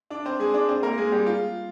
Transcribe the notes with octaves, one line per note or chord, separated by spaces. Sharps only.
D4 D5
C4 C5
G#3 G#4
D4 D5
C4 C5
A#3 A#4
G#3 G#4
G3 G4
F4